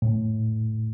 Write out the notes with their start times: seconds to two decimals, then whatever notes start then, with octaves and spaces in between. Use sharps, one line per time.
0.02 A2